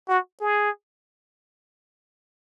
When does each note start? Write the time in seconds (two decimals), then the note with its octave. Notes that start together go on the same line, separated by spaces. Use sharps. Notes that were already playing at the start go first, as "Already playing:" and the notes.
0.09 F#4
0.41 G#4